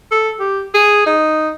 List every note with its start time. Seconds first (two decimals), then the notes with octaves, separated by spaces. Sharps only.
0.11 A4
0.40 G4
0.74 G#4
1.06 D#4